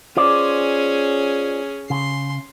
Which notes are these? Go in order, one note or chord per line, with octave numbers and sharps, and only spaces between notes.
C#4 F4 G#4 C5 D5
C#3 C6